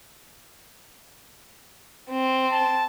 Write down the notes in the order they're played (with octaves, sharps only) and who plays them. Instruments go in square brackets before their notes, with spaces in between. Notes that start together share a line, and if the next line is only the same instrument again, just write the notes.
[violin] C4
[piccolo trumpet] A5